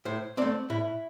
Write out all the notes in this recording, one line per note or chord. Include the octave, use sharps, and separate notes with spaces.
A2 C5
A3 C4 D5
A2 E4